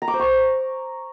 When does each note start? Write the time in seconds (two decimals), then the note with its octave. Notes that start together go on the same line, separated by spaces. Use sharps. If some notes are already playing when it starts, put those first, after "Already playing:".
0.02 A#5
0.08 D6
0.14 C5
0.19 C#6